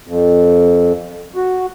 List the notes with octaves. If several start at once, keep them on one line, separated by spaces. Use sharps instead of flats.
F2
F#4